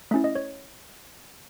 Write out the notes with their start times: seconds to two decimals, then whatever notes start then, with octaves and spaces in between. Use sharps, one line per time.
0.11 A3 C#4 E4 E5
0.24 D#5
0.35 C#5